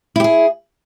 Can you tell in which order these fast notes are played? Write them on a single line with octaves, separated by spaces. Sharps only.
E4 G4 G#4